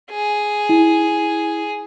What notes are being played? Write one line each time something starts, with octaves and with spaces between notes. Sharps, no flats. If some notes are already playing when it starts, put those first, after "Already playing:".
G#4
E4